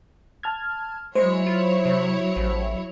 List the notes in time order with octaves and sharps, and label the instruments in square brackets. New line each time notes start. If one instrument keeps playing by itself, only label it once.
[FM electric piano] A5 F6 G#6
[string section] F#3 E4 C#5 [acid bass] G#3 [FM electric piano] C5
[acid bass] F4
C3
A1